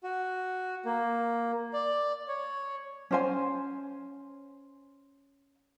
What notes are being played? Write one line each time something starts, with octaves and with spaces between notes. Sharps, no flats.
F#4
A#3
D5
C#5
C#4 C5 G#5